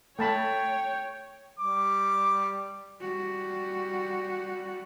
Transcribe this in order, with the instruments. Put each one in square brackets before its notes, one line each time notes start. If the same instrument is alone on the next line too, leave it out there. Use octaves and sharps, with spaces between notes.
[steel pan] A3 A5 B5 [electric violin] C#5 [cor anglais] G5
[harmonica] G3 D6
[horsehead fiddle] G3 F#4